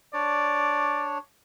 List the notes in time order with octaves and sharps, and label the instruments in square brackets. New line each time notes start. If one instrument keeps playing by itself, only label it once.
[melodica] D4 C#5 [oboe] D5